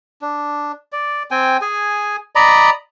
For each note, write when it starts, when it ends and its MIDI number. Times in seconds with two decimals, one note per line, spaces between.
0.22 0.72 62
0.92 1.23 74
1.31 1.57 60
1.31 1.57 79
1.31 1.57 80
1.61 2.16 68
1.61 2.16 80
2.35 2.70 74
2.35 2.70 75
2.35 2.70 82
2.35 2.70 83